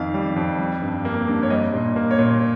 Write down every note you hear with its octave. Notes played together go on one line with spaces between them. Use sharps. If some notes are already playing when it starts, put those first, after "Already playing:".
Already playing: F2 D#3 F5
G3
F2
G3
G2
A#3
G2
C#5
G3 D#5
A#2
A#3
C#5
A#2